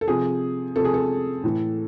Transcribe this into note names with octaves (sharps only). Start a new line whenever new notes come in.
A4
C3 F3 G#4
C3 F3 A4
G#4
A4
A2 E3